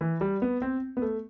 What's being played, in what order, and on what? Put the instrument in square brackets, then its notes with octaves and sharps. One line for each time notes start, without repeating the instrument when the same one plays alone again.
[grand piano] E3
G3
B3
C4
B3
A3